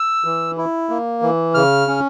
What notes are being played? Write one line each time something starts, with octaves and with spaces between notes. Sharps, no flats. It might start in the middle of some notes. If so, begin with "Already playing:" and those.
Already playing: E6
E3
E4
A#3
E3
C#3 F6
C#4